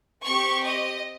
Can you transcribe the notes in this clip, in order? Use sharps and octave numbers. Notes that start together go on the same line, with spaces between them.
C4 G4 C#6
D#5